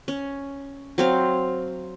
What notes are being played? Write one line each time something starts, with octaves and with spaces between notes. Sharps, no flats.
C#4
F#3 C4 F5